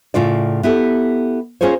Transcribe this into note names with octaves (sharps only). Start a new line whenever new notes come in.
A2 C#3 F4 D5
B3 E4 G4 A4
C#4 F4 G#4 A#4 C5 C#5